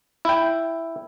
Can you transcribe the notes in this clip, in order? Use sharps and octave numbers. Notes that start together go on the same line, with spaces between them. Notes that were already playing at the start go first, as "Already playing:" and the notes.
E4 G5